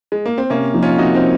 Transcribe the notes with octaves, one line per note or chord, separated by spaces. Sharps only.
G#3
A#3
C4
C3 A#3 C#4
F3 A#3 D#4
C#4 F4
C3 D#4 F#4
C4 D#4